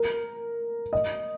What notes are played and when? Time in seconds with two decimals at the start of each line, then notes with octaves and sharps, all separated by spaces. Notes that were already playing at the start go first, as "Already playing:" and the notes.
Already playing: A#4
0.93 D#5